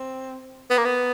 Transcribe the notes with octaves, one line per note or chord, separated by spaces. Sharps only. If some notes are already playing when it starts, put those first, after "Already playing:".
Already playing: C4
B3
A#3
B3